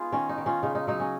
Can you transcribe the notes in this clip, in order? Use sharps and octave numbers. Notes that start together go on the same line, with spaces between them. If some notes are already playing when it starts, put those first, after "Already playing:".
Already playing: B3 D#4 F4 G#4
D#3 C#4
D#4
D#3
C#4 F4
C#3 D#4
D#4
F#3 D#4
C#4